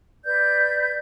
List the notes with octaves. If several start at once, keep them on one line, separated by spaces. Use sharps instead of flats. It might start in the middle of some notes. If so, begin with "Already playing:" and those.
B4 D5 G6